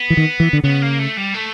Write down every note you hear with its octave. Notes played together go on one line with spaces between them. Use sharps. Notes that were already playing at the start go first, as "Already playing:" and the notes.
Already playing: B3
E3
D#3
E3
D3
C#3 B3
A#3
A3
G3
A3